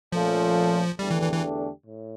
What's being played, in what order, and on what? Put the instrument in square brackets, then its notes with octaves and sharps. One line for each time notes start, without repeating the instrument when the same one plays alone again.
[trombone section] A#2 A3 C#4 F4 A4 [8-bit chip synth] F3
[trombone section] E2 D3 A3 D4 G4 [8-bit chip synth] G3
[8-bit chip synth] E3
E3
E3
[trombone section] A2